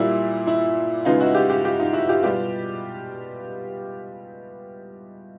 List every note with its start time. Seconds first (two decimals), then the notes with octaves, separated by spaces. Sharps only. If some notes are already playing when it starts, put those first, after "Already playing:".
Already playing: A#2 G3 A#3 E4
0.47 E4
1.05 C#3 E3 G#3 B3 D#4 F4
1.20 E4 F#4
1.35 F4 G4
1.50 F4 G4
1.64 F4 G4
1.80 D#4 F4
1.93 E4 F#4
2.09 F4 G4
2.23 B2 G3 B3 F4 G4